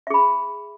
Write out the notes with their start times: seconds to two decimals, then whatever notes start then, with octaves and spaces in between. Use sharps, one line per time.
0.07 E5
0.10 G#4
0.14 B5